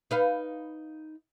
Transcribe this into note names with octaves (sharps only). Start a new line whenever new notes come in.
D#4 B4 F5